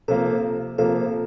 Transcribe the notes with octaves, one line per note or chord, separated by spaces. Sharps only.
C3 F3 A#3 A4
C3 F3 A#3 A4